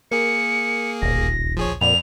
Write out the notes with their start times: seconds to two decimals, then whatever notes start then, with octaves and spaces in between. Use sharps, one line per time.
0.11 A#3 G#4 A#4 C#7
1.02 D#1 A1 D2 A#2 A#6
1.57 F3 G#4 C#5
1.81 F2 A#2 D5 F#5 B5 F7